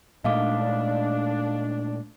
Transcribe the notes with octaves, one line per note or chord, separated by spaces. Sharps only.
A#2 G#3 A3 D4 D#5 F5 D6